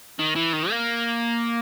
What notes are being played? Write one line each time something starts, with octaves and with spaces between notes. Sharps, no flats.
D#3
E3
D#3
A#3